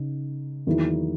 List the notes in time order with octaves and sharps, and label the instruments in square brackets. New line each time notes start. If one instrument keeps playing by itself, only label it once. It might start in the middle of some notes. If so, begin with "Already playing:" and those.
Already playing: [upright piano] C#3 D#4
E2 D#3 F#3 A#3 E4